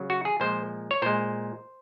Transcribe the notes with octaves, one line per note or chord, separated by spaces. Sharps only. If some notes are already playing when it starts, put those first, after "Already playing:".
Already playing: C#3 F#3
F#4
G#4
A#2 F3 G#3 C5
C#5
A#2 G#3 C5